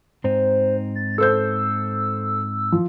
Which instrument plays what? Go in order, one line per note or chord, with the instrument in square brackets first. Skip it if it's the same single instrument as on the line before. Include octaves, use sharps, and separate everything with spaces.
[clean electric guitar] G#2 C4 D#4 [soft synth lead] C5
[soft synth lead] A6
[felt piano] A4 C5 G6 [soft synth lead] E6
[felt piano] F3